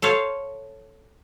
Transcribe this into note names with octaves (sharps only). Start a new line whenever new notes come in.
A4 C5 C#5 F5